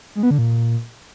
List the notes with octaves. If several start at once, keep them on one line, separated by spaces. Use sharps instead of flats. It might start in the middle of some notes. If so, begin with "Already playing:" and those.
G#3
B3
D3
A#2